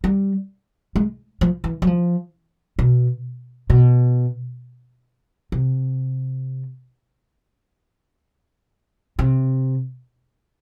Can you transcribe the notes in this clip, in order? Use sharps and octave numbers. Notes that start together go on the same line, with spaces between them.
G3
G#3
F3
E3
F#3
F3
B2
B2
C3
C3